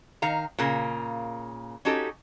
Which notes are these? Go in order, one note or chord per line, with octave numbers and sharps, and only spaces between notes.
D#3 F5 A#5
A#2 C#3 A#3
C#4 D#4 F#4 G4 A4